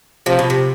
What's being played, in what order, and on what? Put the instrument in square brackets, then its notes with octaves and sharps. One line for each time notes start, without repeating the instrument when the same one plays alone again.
[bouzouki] C3 [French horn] F3
[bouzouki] B2
C3